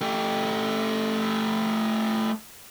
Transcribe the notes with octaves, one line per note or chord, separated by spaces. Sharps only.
A3 G4